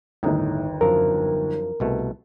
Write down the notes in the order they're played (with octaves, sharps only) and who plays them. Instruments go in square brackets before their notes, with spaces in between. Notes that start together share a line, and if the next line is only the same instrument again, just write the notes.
[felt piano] G1 D#2 [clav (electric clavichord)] A2 D#4
[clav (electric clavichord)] F#2 F3 [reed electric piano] A#4
[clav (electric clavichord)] C2 B2 A3